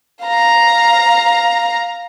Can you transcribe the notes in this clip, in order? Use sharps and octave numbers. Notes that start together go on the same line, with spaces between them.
F5 A#5